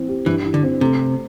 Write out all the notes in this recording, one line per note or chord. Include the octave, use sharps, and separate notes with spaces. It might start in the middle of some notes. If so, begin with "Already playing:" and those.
Already playing: E3 C4
G4
G2 E3
E3
D3
C4
C3 A3